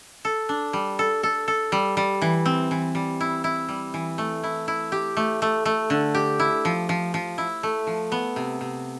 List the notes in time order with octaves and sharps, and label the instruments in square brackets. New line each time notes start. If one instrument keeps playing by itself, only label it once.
[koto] A4
D4
G3
A4
A4
A4
G3
G3
E3
C4
E3
G3
E4
E4
G3
E3
A3
E4
E4
G4
A3
A3
A3
D3
G4
E4
F3
F3
F3
E4
A3
F3
B3
C3
C3